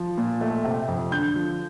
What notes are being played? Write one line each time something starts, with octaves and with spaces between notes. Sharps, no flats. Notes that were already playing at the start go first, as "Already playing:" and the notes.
Already playing: F3
A#2
A3
C3
F2
D3 G6
F3